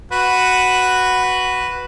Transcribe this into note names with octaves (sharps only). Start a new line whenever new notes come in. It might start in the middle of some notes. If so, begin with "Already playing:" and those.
F#4 B4